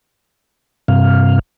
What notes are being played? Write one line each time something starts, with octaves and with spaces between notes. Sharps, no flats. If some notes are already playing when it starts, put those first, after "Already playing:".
G2 C3 F5